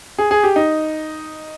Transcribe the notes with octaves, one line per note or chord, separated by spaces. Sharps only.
G#4
G#4
G4
D#4